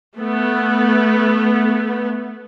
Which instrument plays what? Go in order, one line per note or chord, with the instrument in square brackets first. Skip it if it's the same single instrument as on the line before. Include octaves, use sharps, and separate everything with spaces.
[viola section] A3 B3